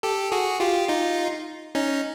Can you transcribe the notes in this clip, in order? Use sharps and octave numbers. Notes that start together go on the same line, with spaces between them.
G4 A4
F#4 G#4
F4 G4
D#4 F4
C#4 D#4